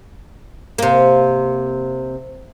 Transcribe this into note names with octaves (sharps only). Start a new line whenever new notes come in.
C3 A#3